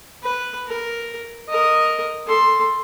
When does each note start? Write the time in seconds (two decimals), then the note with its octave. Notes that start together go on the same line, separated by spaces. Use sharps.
0.23 B4
0.68 A#4
1.49 A#4 D#5
2.27 A4 C6